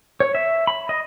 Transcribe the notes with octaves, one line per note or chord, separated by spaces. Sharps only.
C#5
E5
B5
D#5